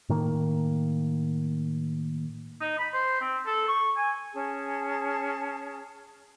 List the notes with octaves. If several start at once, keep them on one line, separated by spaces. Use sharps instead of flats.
A2 D#3 A#3
D#4
B5
C5
C4
A4
C#6
G#5
C#4 G#4 A5